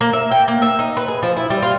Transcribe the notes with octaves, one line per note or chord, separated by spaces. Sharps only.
A#3
E5
G5
A#3
E5
D#4
B4
G#4
F3
E4
G3
F4